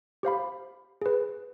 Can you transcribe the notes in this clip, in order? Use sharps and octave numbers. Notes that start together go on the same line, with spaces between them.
G4 C5 F5 B5
G#4 B4